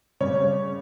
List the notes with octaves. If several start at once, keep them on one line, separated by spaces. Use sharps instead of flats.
C#3 G3 C#4 C#5